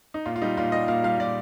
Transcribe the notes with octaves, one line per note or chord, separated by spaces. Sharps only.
D#4
A#2 F4
F4
G3 D#4
A#2 F4
G3 D#5
A#2 F5
G3 F5
A#2 D5